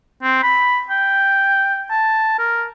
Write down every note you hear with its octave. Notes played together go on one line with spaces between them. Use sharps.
C4
B5
G5
A5
A#4